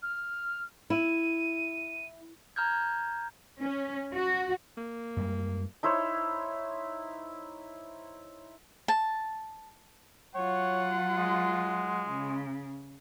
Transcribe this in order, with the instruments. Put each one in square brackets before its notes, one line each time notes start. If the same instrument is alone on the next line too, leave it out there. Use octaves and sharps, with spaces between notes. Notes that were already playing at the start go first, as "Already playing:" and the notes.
[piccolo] F6
[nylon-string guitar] E4 [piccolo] D#7
[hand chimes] A#5 F6 G6 G#6
[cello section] C#4
F#4
[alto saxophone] A#3
[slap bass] F#2 G3 G#3
[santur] D#4 E4 C5 C#5
[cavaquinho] A5
[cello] F#3 F4 [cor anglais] C#5 [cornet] F#5
[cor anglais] G#3
[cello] C#3